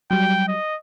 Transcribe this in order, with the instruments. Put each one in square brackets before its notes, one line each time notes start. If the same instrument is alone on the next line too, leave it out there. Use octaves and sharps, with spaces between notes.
[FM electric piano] F#3 G3 [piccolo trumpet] G5
[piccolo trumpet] D#5